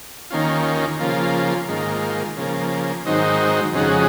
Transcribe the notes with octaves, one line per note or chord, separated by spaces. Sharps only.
D#2 D#3 A#3 C#4 F4
C#3 F3 A#3 F4
G#2 D#3 A#3 F4
C#3 F3 A#3
G#2 D#3 F#3 C4 D#4
F2 C#3 G#3 D#4 F#4